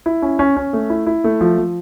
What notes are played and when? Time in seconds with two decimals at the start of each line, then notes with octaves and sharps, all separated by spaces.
0.06 E4
0.22 C#4
0.39 C#4
0.57 C#4
0.73 A3
0.90 E4
1.06 E4
1.24 A3
1.41 F3
1.58 F3